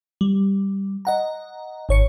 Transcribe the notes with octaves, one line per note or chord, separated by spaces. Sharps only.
G3
D#5 F#5 A#5
G#1 C#5 C#7